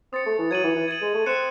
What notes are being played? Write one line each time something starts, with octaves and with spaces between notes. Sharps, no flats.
C4 D#6 A6 C#7
A3
E3
F#3 G#6 D#7 F#7
E3
E3
G#6 D#7 F#7
G#3
A3
C4 F#6 C#7 E7